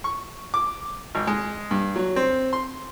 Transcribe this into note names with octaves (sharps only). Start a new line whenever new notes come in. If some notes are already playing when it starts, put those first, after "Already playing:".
C#6
D6
G#1
G#3
G2
F#3
C4
C6